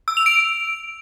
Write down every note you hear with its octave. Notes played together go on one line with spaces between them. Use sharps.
E6
F7
D7